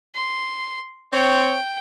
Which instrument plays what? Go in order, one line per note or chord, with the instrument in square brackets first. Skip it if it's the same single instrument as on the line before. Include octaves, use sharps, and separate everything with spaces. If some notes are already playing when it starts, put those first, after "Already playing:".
[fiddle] C6
[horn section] C4 C#5 [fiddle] G5